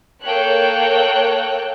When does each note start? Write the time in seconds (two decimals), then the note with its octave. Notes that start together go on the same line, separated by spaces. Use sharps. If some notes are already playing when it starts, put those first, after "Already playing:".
0.22 A#3 A4 C#5 G5 F#6